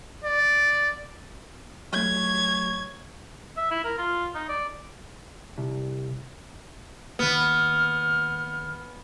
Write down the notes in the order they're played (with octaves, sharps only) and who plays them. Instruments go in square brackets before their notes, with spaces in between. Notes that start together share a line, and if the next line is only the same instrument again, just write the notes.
[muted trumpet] D5
[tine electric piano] F#3 A3 [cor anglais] C#5 [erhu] G#6
[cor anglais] E5
E4
A#4
F4
D#4
D5
[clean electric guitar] C2
[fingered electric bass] D#3 A#3 [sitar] B3 [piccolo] F6